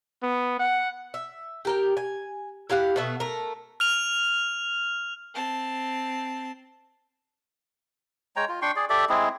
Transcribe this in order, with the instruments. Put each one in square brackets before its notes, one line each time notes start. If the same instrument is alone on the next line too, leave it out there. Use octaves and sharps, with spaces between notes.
[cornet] B3
F#5
[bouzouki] E5
G4 A#4 G5
G#5
E4 G4 F5 F#5
B2 A3 B3 E5
A3 A#4
[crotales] F6 F7
[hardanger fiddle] C4 A5
[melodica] G#3 C#5 G5 A#5
F4
D4 G5 C6 C#6
G#4 D5
G4 A4 D5 E5
G#3 C4 E4 G#4